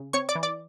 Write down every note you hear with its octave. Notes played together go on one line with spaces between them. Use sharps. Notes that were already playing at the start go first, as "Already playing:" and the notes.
Already playing: C#3
C4 C#5 C#6
D5 D6
E3
D5 D6